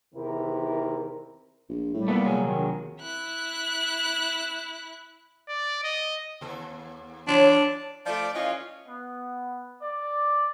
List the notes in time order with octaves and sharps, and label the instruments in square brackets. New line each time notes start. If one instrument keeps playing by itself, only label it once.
[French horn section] E2 C3 D#3 E4 A#4
[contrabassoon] A#1
[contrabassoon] A2 [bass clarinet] G3
[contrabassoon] A#2 [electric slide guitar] A3 B3 E4
[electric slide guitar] C3 F#3 G#4
[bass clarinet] D#3
[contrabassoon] A#1
[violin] E4 F#6
[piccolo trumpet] D5
D#5
[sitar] D#2 A4
[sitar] E3 E4 C#5 [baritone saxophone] D4
[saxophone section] F3 A3 F4 [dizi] D5
[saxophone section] E3 C#4 F4 [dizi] D#5
[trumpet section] B3
D5